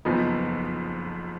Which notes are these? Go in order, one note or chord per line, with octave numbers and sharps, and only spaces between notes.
F#1 F2 F3 B3 D#4